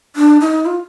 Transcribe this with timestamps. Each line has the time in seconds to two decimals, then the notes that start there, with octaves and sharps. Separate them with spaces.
0.16 D4
0.41 D#4
0.66 F4